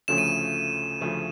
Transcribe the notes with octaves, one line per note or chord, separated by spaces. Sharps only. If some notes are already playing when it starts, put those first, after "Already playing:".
D2 C#3 F3 A3 C#4 E7
D#7
E7
D2 C#3 F3 A3 C#4